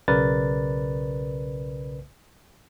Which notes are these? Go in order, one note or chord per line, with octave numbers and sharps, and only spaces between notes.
B1 C#3 A#4 B4 D5 A6